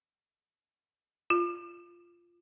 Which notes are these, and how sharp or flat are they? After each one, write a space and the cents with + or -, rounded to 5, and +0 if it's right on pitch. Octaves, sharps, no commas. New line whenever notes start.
F4 -10